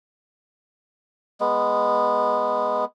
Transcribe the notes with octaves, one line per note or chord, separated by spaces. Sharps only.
G#3 B3